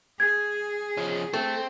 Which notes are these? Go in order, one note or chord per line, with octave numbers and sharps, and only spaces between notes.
G#4 G#6
F3 C#4
A3 C4